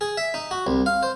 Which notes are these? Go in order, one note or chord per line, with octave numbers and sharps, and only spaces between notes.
G#4
E5
D#4
F#4
C2
F5
C5